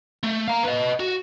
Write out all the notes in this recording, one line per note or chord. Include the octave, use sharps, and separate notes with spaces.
A3
F5 A#5
B4 D#5
F#4